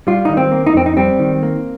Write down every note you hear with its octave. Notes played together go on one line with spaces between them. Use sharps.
G3 F4
D#3 D#4
C4
A#3
D#4
F2 C4
D#4
G3 C4
D#3
A#3